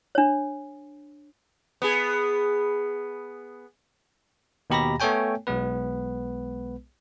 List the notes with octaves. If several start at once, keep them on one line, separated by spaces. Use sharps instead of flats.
D4 C#5
B3 G#4
D#2 B2 G4 A#5 B5 A#6
A3 B3 A4 C#5 G5 G#5
B1 G#3 B3 B4